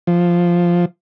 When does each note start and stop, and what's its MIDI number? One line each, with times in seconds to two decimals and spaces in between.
0.07 0.85 53